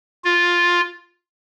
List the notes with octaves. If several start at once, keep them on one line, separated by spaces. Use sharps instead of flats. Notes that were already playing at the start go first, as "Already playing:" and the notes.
F4